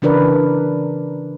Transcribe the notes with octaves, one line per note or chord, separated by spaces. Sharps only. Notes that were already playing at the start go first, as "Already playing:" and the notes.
C#3 E3 D4 A#4 B4 D5